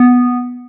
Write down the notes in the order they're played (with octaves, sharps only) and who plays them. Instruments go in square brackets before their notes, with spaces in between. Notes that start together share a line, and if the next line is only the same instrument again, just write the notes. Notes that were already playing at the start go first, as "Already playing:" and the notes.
Already playing: [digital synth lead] B3